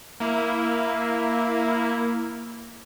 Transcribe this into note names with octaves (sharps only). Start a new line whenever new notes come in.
A#3 E4